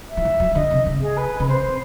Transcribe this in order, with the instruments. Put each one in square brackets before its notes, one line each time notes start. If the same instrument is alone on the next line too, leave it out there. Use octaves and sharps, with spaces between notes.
[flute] E5
[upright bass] E3
D#3
F#3
[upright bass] D3 [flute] D#5
[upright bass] C3
C#3
[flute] G#4
B4
[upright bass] C#3 [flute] B4
[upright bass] C3 [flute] C5